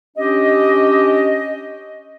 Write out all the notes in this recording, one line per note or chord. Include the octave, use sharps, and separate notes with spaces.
C#4 D4 G4 D#5